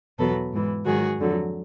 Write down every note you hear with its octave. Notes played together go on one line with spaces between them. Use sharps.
E2 B2 F#3 A4 B4
G#2 E3
G#2 D#3 F#3 F#4 G#4
F2 D3 F#3